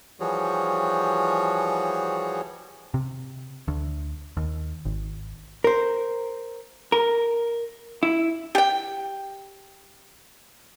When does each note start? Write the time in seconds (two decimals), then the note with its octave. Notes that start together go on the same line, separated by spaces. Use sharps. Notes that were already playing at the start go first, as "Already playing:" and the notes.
0.20 E3 F3 G3 F#4 G#4 C#5
2.94 C3
3.68 D2
4.37 D#2
4.85 G#1
5.64 A#4 C5
6.92 A#4
8.03 E4
8.55 G4 G5